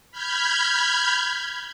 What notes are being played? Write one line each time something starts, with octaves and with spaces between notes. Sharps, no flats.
B5 F6 G6 G#6